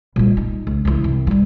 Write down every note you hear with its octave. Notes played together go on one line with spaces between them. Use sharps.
A#2 G3
D#4
C#2
C#2 E3
C2
F3 G3